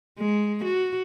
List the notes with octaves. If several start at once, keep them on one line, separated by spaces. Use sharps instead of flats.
G#3
F#4